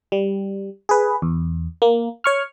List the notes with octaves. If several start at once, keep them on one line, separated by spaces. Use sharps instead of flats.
G3
G#4 B4
E2
A#3
C#5 C#6 F6